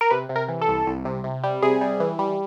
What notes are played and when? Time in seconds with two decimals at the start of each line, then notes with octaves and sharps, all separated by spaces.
0.01 A#4
0.11 C3 B4
0.29 C3
0.36 A#4
0.48 E3
0.62 A4
0.68 C2
0.87 C2
1.05 C3
1.24 C3
1.44 G3
1.63 C3 G#4
1.81 G3
2.00 E3
2.19 G3